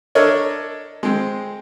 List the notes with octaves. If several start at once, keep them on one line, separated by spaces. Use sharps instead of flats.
D4 A4 A#4 C#5 D#5
G#3 C4